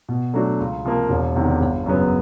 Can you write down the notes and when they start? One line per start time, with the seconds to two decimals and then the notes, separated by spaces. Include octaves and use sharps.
0.09 B2
0.34 F#3 A3 D4 F#4
0.60 C#2
0.85 C3 F3 A#3
1.09 E1
1.35 E2 C3 D#3
1.60 G1
1.86 F#2 C#3 F#3 B3